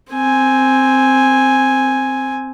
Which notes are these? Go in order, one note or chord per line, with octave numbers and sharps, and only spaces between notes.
C4 G#5